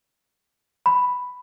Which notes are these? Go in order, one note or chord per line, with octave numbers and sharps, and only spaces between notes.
B5